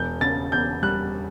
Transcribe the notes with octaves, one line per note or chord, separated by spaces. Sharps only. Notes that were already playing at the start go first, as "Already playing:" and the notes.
Already playing: E1 G6
C#3 A6
E2 G6
G3 F#6